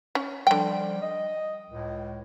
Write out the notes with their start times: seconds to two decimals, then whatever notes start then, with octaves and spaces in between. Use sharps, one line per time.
0.15 C#4
0.47 D3 F3 G3 G5
1.01 D#5
1.70 C#2 A2